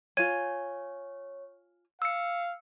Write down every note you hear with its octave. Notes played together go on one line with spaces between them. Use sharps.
F4 C#5 G#5 G#6 D#7
F5 E6 C#7